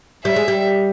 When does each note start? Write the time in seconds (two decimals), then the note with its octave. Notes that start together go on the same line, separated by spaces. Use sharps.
0.25 G3 E5
0.36 G#3
0.48 G3